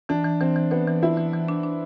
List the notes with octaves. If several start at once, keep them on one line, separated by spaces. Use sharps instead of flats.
E3 D4
E3
E3 C4
E3
E3 B3
E3
E3 E4
E3
E3
D4
D4